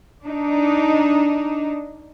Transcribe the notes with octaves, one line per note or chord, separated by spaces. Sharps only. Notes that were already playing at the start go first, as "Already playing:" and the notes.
D4 D#4